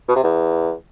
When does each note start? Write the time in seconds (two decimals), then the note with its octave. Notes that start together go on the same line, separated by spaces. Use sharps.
0.08 B2
0.16 C3
0.23 E2